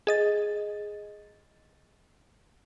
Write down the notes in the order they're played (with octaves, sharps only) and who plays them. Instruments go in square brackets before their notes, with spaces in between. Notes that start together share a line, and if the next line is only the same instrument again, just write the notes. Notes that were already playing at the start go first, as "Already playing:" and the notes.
[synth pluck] G#4 D#5 A6